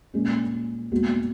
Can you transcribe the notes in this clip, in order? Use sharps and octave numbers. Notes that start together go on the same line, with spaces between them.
A#2 G#3 C#4
A#2 G#3 B3 F#4